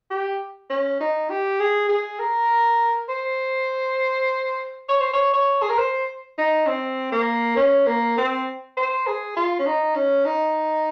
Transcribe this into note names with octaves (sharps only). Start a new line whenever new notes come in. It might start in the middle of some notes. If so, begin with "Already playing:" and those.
G4
C#4
D#4
G4
G#4
G#4
A#4
C5
C#5
C5
C#5
C#5
G#4
A#4
C5
D#4
C4
A#3
C#4
A#3
C4
C5
G#4
F4
C#4
D#4
C#4
D#4